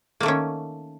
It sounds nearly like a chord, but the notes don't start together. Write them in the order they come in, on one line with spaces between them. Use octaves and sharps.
A#3 A3 D#3 C#4